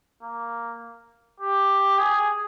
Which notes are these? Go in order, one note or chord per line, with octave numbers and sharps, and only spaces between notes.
A#3
G4
G#4